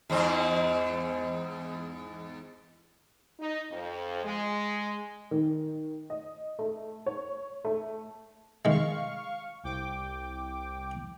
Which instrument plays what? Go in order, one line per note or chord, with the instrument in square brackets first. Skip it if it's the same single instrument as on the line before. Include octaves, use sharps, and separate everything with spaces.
[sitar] E2 G#2 C4
[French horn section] D#4
F2
G#3
[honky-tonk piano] D#3
D#5
A3
C#5
A3
[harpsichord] D#3 G#3 [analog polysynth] F5 C#6
[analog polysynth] C2 G5 D6